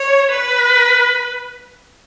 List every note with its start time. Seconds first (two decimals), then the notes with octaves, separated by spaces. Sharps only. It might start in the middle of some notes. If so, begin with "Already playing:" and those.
Already playing: C#5
0.31 B4